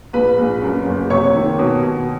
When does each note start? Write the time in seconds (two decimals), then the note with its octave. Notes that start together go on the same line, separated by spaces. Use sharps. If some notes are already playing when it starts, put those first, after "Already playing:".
0.13 A#1 B4 B5
0.38 A#1
0.62 F#2
0.86 F#1
1.10 C3 C#5 C#6
1.34 D#3
1.59 B2
1.83 B2